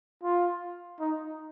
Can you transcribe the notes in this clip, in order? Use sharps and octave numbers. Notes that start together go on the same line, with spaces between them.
F4
D#4